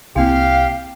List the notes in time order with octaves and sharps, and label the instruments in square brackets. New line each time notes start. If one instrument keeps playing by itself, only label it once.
[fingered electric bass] C2 A#3 [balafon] C4 E4 [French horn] G4 [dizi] F5